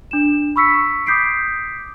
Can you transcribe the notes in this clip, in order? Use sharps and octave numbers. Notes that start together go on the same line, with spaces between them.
D4 E7
B5 C#6 E6 B6 C#7
D6 D#6 G6 B6 C7 D7